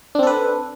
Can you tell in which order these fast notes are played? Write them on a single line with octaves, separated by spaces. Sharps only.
D4 C4 A4 B4